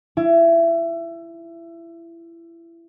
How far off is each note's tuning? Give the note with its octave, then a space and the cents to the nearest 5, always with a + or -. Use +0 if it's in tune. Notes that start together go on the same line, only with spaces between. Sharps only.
E4 +25